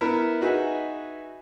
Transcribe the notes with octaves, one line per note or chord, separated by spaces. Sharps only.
B3 E4 A#4 E5
D#4 F#4 G#4 B4 E5